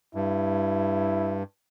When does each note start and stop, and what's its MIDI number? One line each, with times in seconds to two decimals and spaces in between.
0.15 1.43 43
0.15 1.42 64